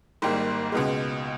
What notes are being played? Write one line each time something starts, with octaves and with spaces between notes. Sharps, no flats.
G#1 G#2 G3 A#3
C#2 B2 G#3